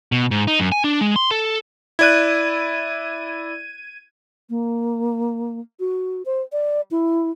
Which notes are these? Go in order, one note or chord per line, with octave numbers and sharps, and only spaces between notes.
B2
G#2
D#4
F#2
G#5
D4
G#3
C6
A4
E4 D5 F#6 G#6 D#7
A#3
F#4
C5
D5
E4